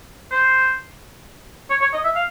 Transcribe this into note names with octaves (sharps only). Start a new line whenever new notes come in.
C5
C#5
C#5
D#5
E5
F5